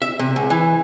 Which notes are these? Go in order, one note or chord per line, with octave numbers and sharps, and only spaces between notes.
E5
C3
C#2
E3